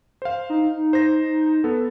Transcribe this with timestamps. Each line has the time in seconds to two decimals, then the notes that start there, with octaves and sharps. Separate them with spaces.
0.22 C5 F5
0.50 D#4
0.93 C5 A#6
1.64 B3 A4